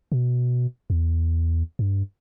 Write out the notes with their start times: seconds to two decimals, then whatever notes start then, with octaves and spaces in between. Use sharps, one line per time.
0.12 B2
0.90 E2
1.79 G2